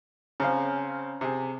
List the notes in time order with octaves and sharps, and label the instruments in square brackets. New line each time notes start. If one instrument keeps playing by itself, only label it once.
[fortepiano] C#3 C4 F5 [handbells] C#4 A#5
[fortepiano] C3 G#4